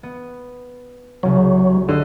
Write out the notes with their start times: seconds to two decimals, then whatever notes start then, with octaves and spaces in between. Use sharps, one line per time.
0.03 B3
1.23 C2 C#3 F#3
1.88 D3 G4 D#5 E6